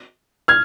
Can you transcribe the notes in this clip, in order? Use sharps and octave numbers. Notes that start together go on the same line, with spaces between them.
F6 G#6